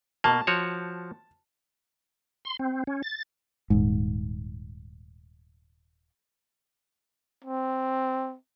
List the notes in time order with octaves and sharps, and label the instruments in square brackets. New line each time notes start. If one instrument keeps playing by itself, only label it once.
[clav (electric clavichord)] B2 A#3 [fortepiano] A5
[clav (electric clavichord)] F3 F#4 C#5
[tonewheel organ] C6
C4
C#4
A6
[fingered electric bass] D#1 G#2
[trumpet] C4